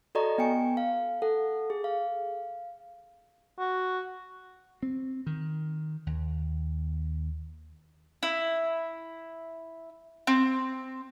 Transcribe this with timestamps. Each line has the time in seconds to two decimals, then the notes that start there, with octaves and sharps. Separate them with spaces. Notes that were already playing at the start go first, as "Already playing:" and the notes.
0.15 F#4 A4 D5 D#5 A#5 C#6
0.38 B3 G5 G#5 C#7
0.77 F5
1.22 A4 F#5
1.70 G#4
1.84 F5
3.60 F#4
4.83 C4
5.26 D#3
6.06 D#2
8.23 E4
10.27 C4